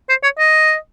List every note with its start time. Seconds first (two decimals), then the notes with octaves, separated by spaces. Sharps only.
0.09 C5
0.23 C#5
0.39 D#5